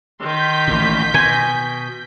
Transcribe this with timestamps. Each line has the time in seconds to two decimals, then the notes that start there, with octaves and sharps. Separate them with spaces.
0.21 D#3 C6 G6 B6
0.68 A1 A#2
1.14 B2 G#5